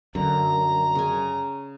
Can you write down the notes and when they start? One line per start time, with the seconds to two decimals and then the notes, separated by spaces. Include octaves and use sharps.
0.15 F#2 D3 A#5
0.95 C#3 G#5